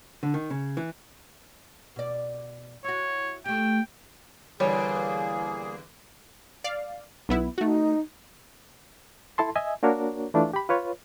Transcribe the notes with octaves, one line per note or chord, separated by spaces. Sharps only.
D3
D#3
C#3
E3
B2 D5
E4 F#4 C#5
A3 G4 G5
E2 D3 G3 A#3 G#4 C#5 G#5
D5 F5
B1 B3 E4
A3 D#4 F#4
E4 A4 A5 C6
D#5 E5 G#5
A#3 D4 F#4 A#4 C#5
E3 A3 D4 F4
G4 B5
F4 B4 C#5